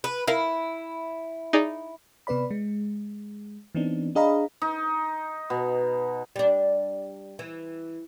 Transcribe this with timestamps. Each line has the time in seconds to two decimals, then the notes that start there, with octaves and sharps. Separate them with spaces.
0.04 B4
0.28 E4 A#4 F5 B5
1.53 D#4 G#4 D5
2.27 C3 B3 B4 D5 B5
2.51 G#3
3.75 E3 B3 C4 D4 D#4
4.15 D4 G#4 D#5 F5 A#5 B5
4.62 D#4
5.50 B2
6.36 G3 D4
7.39 E3